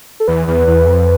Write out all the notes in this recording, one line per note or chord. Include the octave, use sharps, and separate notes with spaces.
A4
E2 B4
E2
E2
F2